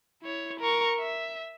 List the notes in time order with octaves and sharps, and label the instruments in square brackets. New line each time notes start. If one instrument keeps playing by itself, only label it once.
[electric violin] E4 C#5
A#4 C#6
E5